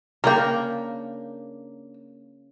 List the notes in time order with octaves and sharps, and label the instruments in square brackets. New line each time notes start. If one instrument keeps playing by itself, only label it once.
[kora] C#3 A#3 D4 [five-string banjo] A#4 G5